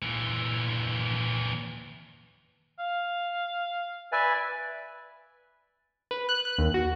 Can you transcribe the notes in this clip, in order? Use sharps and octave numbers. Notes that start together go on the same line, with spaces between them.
A#2 E3
F5
B4 D5 E5 G#5
B4
F#6
F#6
D#2
F#4